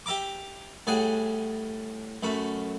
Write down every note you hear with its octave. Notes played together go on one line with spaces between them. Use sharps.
G4 E5 A#5 D6
A2 G3 G#4 F#5 G#5
F#2 A3 F#4 B5